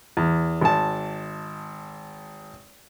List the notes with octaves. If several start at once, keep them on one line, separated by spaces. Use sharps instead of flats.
E2
G#1 A5